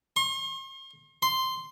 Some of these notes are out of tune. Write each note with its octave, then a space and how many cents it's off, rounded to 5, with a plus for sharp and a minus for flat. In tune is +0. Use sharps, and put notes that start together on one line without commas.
C6 +45
C6 -5